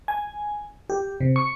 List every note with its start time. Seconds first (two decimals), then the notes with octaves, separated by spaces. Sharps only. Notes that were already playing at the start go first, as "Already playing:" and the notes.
0.08 G#5
0.90 G4
1.21 C3
1.36 C#6